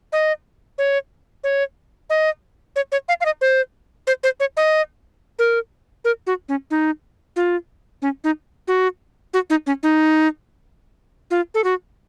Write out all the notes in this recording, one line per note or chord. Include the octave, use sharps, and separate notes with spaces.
D#5
C#5
C#5
D#5
C#5
C#5
F5
F5
D#5
C5
C5
C5
C#5
D#5
A#4
A#4
F#4
C#4
D#4
F4
C#4
D#4
F#4
F#4
D#4
C#4
D#4
F4
A4
F#4